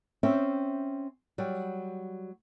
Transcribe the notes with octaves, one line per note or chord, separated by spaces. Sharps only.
C4 C#4 E5 G5
F#3 G3